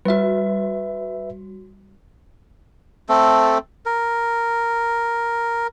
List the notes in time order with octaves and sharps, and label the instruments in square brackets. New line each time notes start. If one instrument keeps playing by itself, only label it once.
[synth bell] G3 F#4 [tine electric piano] B4 E5
[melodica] A3 C4 A4
A#4